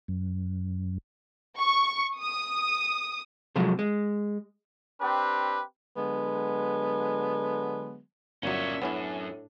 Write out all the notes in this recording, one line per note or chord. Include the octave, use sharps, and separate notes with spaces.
F#2
C#6
D#6
C3 F3 F#3 G#3 A3
G#3
C4 D4 G4 B4
D3 F#3 G#3 B3
G1 A#2 F#3 C#4 E4 C#5 E5
F#2 A2 B3 C#4 D4 E4